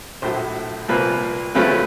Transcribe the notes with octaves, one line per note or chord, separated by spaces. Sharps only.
A#1 A2 F#3 C5
C2 A#2 F3 A#3 B4
F#2 C#3 F3 A3 C#4 B4